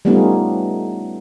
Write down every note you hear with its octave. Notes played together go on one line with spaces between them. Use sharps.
G3 A3 B3 C#4 D#4 F4